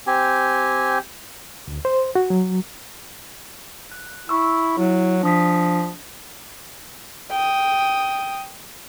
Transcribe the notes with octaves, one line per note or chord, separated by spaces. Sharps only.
C4 G4 G#5
D2
C5
F#4
F#3
F#6
E4 C#6 E6
F#3 E4
F3 D4 D#6 B6
G5 D#6